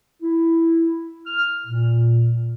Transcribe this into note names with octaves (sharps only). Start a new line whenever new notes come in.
E4
F6
A#2